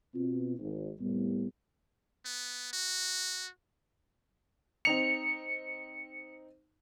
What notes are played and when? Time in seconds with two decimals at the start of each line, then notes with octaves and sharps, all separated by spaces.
0.15 B2 C4 F4
0.59 G#1
1.00 C2 A2 G3 B3
2.25 B3
2.73 F#4
4.85 C4 D#4 C#7 F7